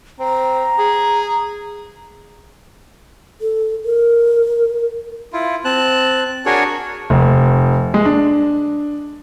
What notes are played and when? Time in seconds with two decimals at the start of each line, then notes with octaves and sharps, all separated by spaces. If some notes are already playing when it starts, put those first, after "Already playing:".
0.19 C4 A#5
0.79 G#4
3.41 A4
3.85 A#4
5.33 E4 F4
5.65 C4 A5 F#6
6.46 D4 F#4 G#4 A#4 C#5
7.10 F1
7.94 G#3
8.05 D4